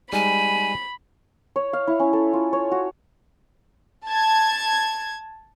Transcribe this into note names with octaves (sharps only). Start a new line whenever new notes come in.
G3 G#3 D#4 G#5 B5
C#5
F5
E4
C#4
A4
F4
C#5
F#4
A5 G#6